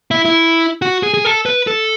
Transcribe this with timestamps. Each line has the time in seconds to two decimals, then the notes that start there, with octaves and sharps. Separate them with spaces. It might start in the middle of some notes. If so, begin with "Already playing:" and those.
0.11 E4
0.25 E4
0.82 F#4
1.03 G#4
1.14 G#4
1.25 A4
1.46 B4
1.67 A4